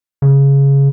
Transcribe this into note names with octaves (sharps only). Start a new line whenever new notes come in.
C#3